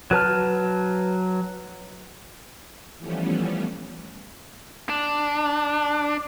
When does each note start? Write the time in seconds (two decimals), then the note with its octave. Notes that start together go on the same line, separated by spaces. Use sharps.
0.11 F#3 B4 A5 F6
2.98 E3 F3 G3 A3 B3 C#4
4.90 D4